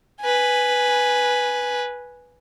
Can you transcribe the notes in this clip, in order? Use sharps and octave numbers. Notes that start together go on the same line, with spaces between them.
B4 G#5